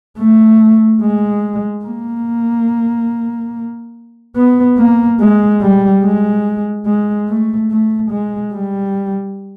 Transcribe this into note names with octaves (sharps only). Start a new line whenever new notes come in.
A3
G#3
A#3
B3
A#3
G#3
G3
G#3
G#3
A3
A3
G#3
G3